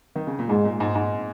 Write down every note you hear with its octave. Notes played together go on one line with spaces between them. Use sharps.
D#3
C#3
A#2
G#2 G#3
A#2
G#2
G#2